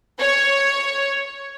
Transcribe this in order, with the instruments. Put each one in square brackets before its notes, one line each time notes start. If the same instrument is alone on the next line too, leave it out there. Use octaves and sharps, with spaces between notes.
[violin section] C#5